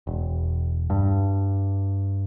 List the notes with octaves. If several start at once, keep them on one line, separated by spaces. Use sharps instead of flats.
E1
G2